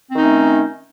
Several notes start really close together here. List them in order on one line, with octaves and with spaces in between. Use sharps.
C4 D#3 D#4 C#4 A3